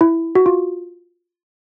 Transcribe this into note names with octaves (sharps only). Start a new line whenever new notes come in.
E4
F#4
F4